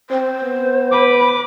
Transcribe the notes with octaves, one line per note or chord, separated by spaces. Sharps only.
C4 C5
B3
B4 D6